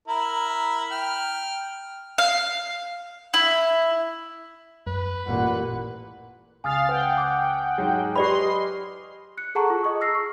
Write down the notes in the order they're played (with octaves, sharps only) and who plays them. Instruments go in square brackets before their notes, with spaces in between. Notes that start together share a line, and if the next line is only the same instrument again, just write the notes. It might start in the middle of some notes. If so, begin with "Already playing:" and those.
[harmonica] E4 A#4
G5 F6
[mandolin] F5
E4
[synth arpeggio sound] F#2 [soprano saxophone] B4
[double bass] A1 A#2 [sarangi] F#5
[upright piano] C#2 [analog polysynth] F5 A6 [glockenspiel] G#5 D#6 F6
[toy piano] B4 [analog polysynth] F#5 G5
[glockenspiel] D6
[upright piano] G#2 F#3 G#3
[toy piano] G4 D5 B5 [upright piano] B4 [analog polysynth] D#5 C6
[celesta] F#6 C#7
G#4 A4 F#5 A5 A#5 C#6
F4
G#4 D#5 C#6 D#6
E6 F6 A#6 C7
C#6